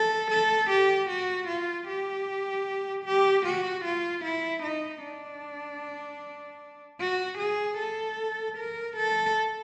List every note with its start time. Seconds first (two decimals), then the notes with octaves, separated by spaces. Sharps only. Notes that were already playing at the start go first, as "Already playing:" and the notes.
Already playing: A4
0.31 A4
0.70 G4
1.09 F#4
1.48 F4
1.88 G4
3.05 G4
3.46 F#4
3.85 F4
4.24 E4
4.63 D#4
5.03 D4
7.00 F#4
7.38 G#4
7.78 A4
8.57 A#4
8.97 A4